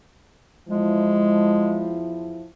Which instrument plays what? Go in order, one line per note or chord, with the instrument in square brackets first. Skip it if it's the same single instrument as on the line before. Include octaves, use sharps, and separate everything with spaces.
[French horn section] E2 F3 E4 [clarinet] G#3